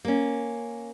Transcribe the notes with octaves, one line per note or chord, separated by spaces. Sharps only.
A#3 C#4